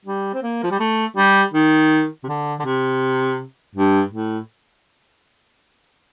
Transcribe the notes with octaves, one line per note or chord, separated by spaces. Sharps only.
G3
C4
A#3
F3
G3
A3
G3
D#3
C3
D3
D3
C3
G2
A2